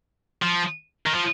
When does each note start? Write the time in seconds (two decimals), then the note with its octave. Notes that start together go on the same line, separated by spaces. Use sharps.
0.43 F3
1.06 D#3
1.15 F3